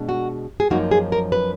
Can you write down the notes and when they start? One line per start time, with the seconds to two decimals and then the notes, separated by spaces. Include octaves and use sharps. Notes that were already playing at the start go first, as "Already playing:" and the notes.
Already playing: B2 G#3 D4
0.09 F#4
0.60 G#4
0.70 F#2 F3 A#3 D#4 F#4
0.91 G#4
1.12 A#4
1.32 B4